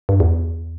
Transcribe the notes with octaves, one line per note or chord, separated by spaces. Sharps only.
G2
E2